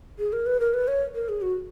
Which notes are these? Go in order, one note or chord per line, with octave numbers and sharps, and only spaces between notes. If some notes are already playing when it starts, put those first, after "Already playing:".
G#4
A#4
B4
A#4
B4
C#5
A#4
G#4
F#4